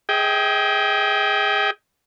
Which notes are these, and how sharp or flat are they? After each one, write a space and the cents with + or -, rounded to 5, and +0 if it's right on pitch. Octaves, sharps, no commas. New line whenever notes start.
G#4 +0 D#5 +40 G5 +0